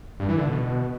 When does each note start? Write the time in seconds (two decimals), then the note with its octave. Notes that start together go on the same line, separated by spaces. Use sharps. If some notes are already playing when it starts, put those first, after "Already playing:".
0.20 G2
0.29 E3
0.38 D3
0.47 B2